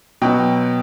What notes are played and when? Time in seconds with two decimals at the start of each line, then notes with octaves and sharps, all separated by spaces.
0.22 B2 F#3 G5